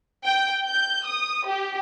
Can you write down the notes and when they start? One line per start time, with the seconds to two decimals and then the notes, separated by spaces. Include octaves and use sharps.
0.25 G5
0.65 G6
1.06 D#6
1.48 G4